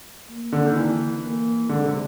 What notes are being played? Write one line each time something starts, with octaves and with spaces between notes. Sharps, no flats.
A#3
D3
D#3
E3
A#3
D3 G#3
C3